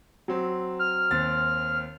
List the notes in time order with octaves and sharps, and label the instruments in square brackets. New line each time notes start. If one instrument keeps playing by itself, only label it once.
[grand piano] F#3 C4
[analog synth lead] F6
[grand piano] D#2 C4 A6